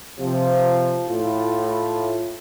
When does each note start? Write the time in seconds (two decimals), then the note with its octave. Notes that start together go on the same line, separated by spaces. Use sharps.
0.19 C3 F3
1.09 A2 F4